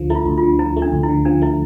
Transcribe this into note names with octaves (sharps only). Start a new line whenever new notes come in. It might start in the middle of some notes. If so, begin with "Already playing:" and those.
Already playing: D2 D3 F3
A3 E4
F4
D2
F4
D3
F3 E4
A3
D4
D2
E4
D3
F3 D4
A3 E4